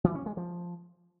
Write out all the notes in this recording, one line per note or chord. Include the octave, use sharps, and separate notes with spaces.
E3
C#4
G#3
F3